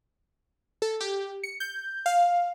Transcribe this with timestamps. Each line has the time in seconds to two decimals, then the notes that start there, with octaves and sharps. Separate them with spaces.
0.82 A4
1.01 G4
1.43 C#7
1.60 G6
2.06 F5